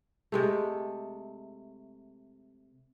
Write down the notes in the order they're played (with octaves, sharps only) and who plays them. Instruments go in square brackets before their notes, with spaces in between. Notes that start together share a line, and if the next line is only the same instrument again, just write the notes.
[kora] C3 G#3 A3